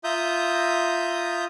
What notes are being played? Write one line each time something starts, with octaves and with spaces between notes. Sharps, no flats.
F4 E5 A#5 D#6 G6